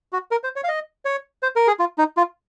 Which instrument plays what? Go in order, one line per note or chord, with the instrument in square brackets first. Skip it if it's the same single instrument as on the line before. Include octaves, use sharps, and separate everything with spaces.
[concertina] F#4
A#4
C5
C#5
F5
D#5
C#5
C5
A#4
G#4
F4
D#4
F4